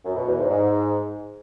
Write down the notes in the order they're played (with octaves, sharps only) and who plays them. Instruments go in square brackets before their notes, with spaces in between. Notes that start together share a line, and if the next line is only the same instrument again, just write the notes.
[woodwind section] F#2
B2
E2
G#2
G#2